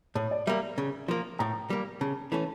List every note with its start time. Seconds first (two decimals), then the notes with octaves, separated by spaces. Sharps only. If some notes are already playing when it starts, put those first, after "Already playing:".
0.15 A2 C#5
0.31 D5
0.47 G3 A#3 E5
0.78 C#3
1.08 F3 A#3
1.39 A2 A#5
1.70 G3 A#3
2.01 C#3 A5
2.32 E3 A3 C#4 A5